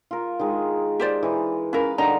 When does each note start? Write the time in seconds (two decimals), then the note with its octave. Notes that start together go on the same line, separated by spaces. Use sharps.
0.11 F4 A#4
0.39 D#3 G#3
1.00 G4 C5 D5
1.23 E3 D#4
1.73 C#4 A#4 B4 F5 B5
1.98 D3 D#3 G3 D#5 A#5